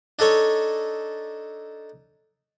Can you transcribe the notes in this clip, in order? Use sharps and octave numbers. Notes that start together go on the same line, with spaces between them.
D4 D#4 A4 C#5